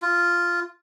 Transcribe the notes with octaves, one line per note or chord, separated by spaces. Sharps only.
F4